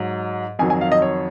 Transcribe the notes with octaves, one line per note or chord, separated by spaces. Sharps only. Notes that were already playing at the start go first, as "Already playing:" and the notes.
Already playing: G#2 F#3
F2 D#3 F#3 G#5
G#5
F5
D#5
C#5